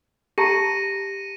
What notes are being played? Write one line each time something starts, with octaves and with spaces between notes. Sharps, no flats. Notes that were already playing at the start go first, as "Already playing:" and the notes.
G4 A5 A#5 A#6 C#7 D#7